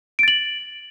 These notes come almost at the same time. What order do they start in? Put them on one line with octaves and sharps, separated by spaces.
D7 A6 F#7